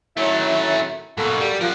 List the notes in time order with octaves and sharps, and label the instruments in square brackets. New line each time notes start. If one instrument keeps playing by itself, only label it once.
[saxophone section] D#3 F#3 E4 [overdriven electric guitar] A3 C#4
[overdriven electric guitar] G#2 B2 [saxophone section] A#3 F#4 A4
[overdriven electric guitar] G3
[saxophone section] A#2 F3 [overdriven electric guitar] A#4 F#5